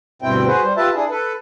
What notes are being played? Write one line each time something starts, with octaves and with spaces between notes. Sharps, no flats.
D2 G2 B2 C4 E4 G5
F#4 G#4 B4 C5
G3 C5
F4 G4 B4 E5 A5
D4 E4 G#4
A4 B4